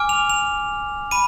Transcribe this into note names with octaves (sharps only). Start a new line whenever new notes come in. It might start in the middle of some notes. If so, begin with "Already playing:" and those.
Already playing: G#5 D6 F6
F7
F7
B5 D#7